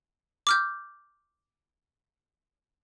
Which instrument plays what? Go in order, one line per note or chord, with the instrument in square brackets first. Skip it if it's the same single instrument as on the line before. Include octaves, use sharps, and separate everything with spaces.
[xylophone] D6 F6 G6